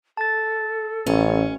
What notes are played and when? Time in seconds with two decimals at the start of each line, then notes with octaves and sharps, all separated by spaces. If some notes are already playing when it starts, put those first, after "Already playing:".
0.17 A4 A5 A6
1.07 A1 C#4